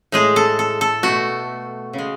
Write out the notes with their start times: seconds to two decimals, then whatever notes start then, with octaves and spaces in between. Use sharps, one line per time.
0.12 A2 G#3 G#4
0.36 A4
0.59 A4
0.81 A4
1.03 B2 A3 F#4
1.93 C#3
1.98 G#3